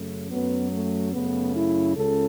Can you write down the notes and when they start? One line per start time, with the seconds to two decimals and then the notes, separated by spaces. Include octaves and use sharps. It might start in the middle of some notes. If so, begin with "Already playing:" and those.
Already playing: F#2 C#3 A3
0.30 F#2 F#3 A3 B3
0.72 A3
1.14 F#2 C#3 A3 B3
1.56 E4
1.97 C#2 C#3 A4